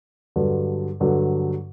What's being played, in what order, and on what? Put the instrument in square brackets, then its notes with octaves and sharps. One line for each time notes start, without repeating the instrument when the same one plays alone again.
[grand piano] G2 D3 F#3
G2 D3 F#3